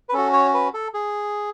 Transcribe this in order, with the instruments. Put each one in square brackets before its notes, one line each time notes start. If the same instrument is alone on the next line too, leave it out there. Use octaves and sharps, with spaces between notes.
[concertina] B4
C#4 F#4 A4
C#5
B4
A4
G#4